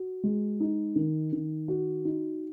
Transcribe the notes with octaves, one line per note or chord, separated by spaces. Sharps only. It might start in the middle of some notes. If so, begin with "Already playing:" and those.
Already playing: F#4
G#3
D#4
D#3
D#3
F#4
D#4